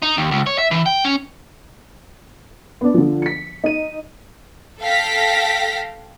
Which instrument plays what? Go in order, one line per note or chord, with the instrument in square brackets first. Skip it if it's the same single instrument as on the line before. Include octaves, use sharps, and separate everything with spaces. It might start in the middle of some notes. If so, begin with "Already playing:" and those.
[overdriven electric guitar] D#4
D#2
C#2
C#5
E5
E3
G5
C#4
[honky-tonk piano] B3 D4
D3 F3
B6 C#7
D#4 D#7
[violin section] A4 F5 G5 A#6 B6